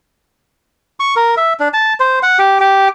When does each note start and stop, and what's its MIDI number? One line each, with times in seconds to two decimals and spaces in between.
1.00 1.15 85
1.16 1.35 70
1.37 1.53 76
1.60 1.68 62
1.74 1.94 81
2.00 2.19 72
2.23 2.39 78
2.39 2.58 67
2.60 2.88 67